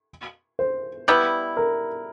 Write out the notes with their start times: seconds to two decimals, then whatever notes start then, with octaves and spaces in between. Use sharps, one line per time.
0.59 C5
1.08 G3 B3 E4
1.57 A#4